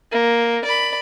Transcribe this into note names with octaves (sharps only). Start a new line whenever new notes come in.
A#3
D5 B5